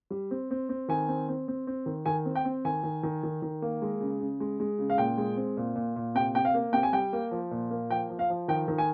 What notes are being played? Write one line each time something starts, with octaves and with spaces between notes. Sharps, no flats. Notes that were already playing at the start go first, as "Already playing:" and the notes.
G3
C4
C4
C4
D#3 G#5
C4
C4
C4
C4
D#3
D#3 G#5
C4
G5
C4
D#3 G#5
D#3
D#3
D#3
D#3
A#3
G#3
C#3
C#3
G#3
G#3
C#3
F5
A#2 G5
G#3
C4
A#2
A#2
A#2
C3 G5
C3 G5
F5
A#3
C3 G5
G#5
G3 G5
A#3
F3
A#2
A#3
F3 G5
F3
F5
F3
D#3 G5
D#3
G#5